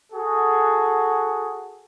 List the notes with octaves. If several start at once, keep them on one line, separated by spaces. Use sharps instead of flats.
F#4 G#4 A4